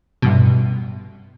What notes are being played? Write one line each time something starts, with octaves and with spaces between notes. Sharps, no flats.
A1 G2 B2